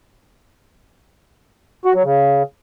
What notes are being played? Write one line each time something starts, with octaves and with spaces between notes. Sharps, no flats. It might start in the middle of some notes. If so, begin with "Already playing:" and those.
F#4
F#3
C#3